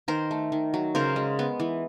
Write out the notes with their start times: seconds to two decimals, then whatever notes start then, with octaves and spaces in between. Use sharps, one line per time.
0.08 D#3 A#4 C5
0.31 A3
0.52 D#3
0.74 F#3
0.95 C#3 A#4 C5
1.16 G#3
1.39 B3
1.60 E3